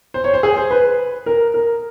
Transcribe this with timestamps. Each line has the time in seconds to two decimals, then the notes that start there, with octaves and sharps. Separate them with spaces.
0.14 C5
0.24 C#5
0.34 C5
0.43 G#4
0.57 C5
0.71 B4
1.26 A#4
1.54 A#4